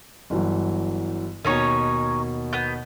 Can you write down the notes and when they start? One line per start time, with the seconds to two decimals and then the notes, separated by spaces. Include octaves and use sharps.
0.30 G1 E3 F#3
1.44 D#2 B2 C#4 D#4 C#5
2.53 B3 G6